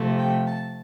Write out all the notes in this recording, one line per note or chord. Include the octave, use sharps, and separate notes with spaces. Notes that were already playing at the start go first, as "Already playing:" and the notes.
Already playing: C3 F3 A3
G5
A5